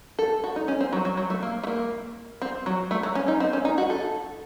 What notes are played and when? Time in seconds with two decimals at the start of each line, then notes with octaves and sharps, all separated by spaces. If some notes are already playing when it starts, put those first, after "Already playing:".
0.19 A4
0.44 F#4
0.56 D#4
0.68 C#4
0.81 C4
0.93 F#3
1.05 F#3
1.17 F#3
1.30 A3
1.43 A#3
1.63 A3
1.67 A#3
2.42 C4
2.66 F#3
2.91 A3
3.03 F#3
3.15 C#4
3.28 D#4
3.40 C4
3.53 C#4
3.65 D#4
3.78 F#4
3.90 A4